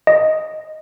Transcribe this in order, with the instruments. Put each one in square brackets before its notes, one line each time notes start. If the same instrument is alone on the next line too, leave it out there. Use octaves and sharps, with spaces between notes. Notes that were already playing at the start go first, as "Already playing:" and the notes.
[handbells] D#5